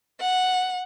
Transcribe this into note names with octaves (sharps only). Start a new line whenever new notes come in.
F#5